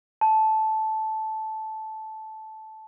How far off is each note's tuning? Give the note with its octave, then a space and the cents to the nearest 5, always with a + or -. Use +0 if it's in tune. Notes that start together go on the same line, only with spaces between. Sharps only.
A5 -10